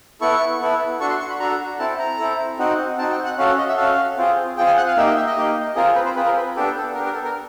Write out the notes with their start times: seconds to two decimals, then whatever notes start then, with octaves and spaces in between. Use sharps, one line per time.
0.21 B3 E4 A4 C#6
0.60 B3 E4 A4
1.00 D4 F#4 A4 C#6
1.10 C6
1.20 C#6
1.30 B5
1.40 D4 F#4 A4 A#5
1.79 C4 E4 A4 A5
1.99 A#5
2.19 C4 E4 A4
2.59 C4 D#4 F#4
2.98 C4 D#4 F#4 A5
3.11 G5
3.25 F#5
3.38 C#4 F#4 A4 F5
3.58 D#5
3.68 E5
3.77 C#4 F#4 A4 F5
4.17 C4 F4 G#4
4.57 C4 F4 G#4 G5
4.66 G#5
4.77 F#5
4.87 F5
4.97 A#3 D#4 G4 E5
5.06 D#5
5.16 E5
5.27 D#5
5.37 A#3 D#4 G4
5.75 C4 F4 G#4 A#4
5.95 B4
6.05 C5
6.15 C4 F4 G#4 B4
6.26 A#4
6.36 B4
6.56 B3 D4 G4 A4
6.77 A4
6.94 B3 D4 G4 A#4
7.05 A#4
7.14 A4
7.24 A#4